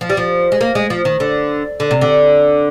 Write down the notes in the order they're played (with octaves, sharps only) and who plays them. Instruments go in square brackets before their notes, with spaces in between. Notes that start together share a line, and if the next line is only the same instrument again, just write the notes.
[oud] F3
G3
F3
G#3
A#3
G#3
F3
D#3
D3
D3
C3
D3